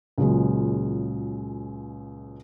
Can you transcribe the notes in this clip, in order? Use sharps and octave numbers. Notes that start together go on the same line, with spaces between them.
C#2 A#2 F#3 G#3